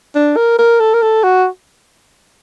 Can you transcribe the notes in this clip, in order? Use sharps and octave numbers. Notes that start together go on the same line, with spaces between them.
D4
A#4
A#4
A4
A#4
A4
F#4